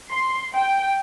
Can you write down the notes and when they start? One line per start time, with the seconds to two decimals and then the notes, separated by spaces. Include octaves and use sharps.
0.11 C6
0.55 G5